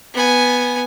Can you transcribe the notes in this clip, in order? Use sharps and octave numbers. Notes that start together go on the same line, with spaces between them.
B3 G#5